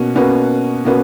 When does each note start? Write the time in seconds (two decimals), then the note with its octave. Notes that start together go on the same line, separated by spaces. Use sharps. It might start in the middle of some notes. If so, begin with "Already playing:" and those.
Already playing: B2 A#3 C#4 F#4
0.15 B2 A#3 C#4 F#4 B4
0.85 B2 A#3 C#4 F#4 B4